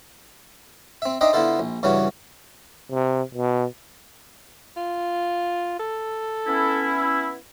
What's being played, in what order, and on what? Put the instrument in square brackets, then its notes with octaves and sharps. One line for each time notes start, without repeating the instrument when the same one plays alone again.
[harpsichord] C4 E5
D4 D#4 C5 D#5 E5 G5
D3 B3 E4 F4 A4 C5
A#1
G2 C#3 E3 C#4 F#4
[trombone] C3
B2
[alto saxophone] F4
A4
[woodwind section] B3 C#4 E4